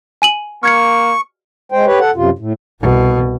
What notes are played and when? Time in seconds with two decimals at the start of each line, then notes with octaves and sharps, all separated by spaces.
0.22 G#5 D#7 F#7
0.63 A#3 C#6 F6 G#6 C#7
1.72 G#3 C5 G5
1.86 G4 B4 C#5
1.99 A4 F#5
2.15 F#2 C3 F4
2.39 A2
2.81 C2 B2